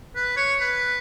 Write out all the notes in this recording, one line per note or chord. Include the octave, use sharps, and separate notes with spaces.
B4
C#5
B4